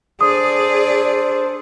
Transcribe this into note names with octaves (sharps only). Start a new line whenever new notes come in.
D4 G#4 A4 C5 D5 D#6